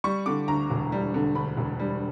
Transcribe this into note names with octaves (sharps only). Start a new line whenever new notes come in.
G3 C#6
D3 D6
D2 A#5
E1
G3
D3
D2 B5
E1
G3